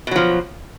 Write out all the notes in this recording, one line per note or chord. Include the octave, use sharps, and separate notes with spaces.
B2 F3 F#3